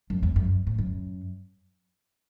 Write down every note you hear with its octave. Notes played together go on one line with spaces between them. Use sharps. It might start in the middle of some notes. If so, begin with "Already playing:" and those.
F#2
E2
F#2
A2
F#2